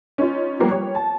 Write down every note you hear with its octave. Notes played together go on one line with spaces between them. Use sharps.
C#4 D#4 F4
F3 G3 A#3 B3
G3 C#5
A5